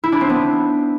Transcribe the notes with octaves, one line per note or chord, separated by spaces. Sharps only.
E4
D4
C4
B3